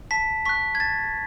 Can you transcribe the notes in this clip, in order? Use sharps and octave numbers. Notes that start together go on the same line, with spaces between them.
A5 B6
C#6 F#6 B6
G#6
A5 A6